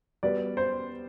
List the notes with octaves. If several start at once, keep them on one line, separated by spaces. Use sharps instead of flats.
G3 B3 F#4 B4 D5
C5